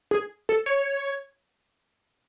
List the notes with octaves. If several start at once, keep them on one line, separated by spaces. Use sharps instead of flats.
G#4
A4
C#5